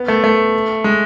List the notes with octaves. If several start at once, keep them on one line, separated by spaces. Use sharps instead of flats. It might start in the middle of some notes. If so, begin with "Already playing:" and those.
Already playing: B3
A3
A3
G#3